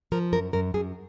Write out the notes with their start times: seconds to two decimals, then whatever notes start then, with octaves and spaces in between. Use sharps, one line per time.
0.12 F3 A#4
0.33 F#2 A#4
0.53 F#2 A#4
0.74 F#2 G#4